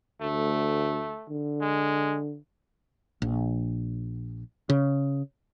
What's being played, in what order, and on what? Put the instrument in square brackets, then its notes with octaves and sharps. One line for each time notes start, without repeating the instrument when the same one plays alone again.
[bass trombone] D2 [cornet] A3
[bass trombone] D3
[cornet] G#3
[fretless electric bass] A#1
C#3